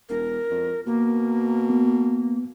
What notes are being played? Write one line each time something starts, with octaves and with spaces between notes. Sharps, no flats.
E1 A#4
F2
B2 A#3
B3